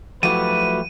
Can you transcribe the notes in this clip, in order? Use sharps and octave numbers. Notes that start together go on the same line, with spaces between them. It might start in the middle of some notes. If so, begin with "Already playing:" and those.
F3 F#3 A3 E4 F#4 G4 B4 D#7